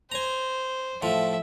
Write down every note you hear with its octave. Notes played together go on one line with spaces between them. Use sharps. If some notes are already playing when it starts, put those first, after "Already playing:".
C5 G#5 A#5
A2 F3 E5